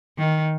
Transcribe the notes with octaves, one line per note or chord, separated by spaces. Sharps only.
D#3